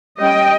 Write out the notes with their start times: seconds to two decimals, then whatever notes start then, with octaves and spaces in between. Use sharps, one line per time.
0.19 G3 C#4 D#5 G5